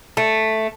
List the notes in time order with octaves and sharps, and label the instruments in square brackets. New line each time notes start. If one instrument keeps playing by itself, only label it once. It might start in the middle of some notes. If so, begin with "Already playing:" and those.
[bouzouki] A3